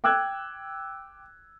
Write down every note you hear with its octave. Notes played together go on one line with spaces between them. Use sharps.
G5 D6 E6 F#6 G#6